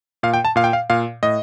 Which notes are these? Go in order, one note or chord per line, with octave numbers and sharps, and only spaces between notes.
A#2 F5
G5
A5
A#2 F5
G5
F5
A#2 F5
A2 D#5